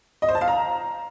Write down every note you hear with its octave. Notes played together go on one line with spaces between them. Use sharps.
D#5
C5
A5
F5
A#5